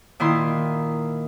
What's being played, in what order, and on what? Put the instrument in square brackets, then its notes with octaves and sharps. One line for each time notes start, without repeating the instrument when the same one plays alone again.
[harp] A#2 D#3 E4 C6